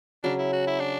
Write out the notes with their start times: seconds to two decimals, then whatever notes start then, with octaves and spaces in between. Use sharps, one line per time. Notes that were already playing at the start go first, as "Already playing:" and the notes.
0.23 C#3 F#3 C#4 D4
0.39 E4
0.53 F#4
0.67 E4
0.80 D4